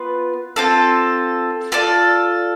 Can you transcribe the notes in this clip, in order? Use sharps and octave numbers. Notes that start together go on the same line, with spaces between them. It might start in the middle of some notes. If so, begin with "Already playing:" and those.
Already playing: B3 F4 B4
C4 F4 A4
F4 A4 D5